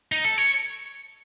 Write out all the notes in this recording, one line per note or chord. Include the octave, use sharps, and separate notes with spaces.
D#4
A4
C#5